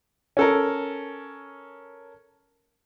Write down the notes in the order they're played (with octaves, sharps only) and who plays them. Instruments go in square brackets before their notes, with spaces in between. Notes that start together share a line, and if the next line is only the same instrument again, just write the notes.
[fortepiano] C#4 A4 A#4